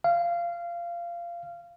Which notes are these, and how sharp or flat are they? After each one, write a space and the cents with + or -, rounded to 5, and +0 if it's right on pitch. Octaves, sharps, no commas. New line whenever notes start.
F5 -20